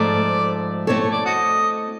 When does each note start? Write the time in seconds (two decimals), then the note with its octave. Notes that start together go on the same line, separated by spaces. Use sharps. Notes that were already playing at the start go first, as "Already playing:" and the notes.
Already playing: G#2 F3 A3 D5
0.87 A3 C4 E4 A4 C#5
1.00 C#5
1.12 D5
1.25 F#4 D#5